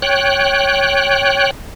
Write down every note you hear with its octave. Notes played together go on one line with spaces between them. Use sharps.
C#5 G5 F#6